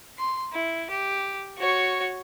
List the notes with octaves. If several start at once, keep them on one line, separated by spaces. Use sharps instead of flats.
C6
E4
G4
F#4 C#5